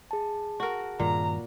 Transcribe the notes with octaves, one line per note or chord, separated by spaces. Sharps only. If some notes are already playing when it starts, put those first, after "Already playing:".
G#4 A5
F#4 A#4
G2 A#2 D#3 A#5